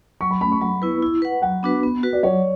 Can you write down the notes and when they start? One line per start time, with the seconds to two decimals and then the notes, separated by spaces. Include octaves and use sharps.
0.21 F#3 C#6
0.31 B5
0.41 A3 C#4 B5
0.52 C#6
0.61 F#3 B5
0.82 B3 E4 B4
1.02 E4
1.22 B4 F#5
1.42 F#3 F#5
1.63 B3 D4 F#4 B4
1.83 B3
2.03 F#4 B4
2.13 D5
2.23 F#3 C#5